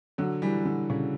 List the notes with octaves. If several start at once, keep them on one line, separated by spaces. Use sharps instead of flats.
D3 F#3
E3 G3
D3
C#3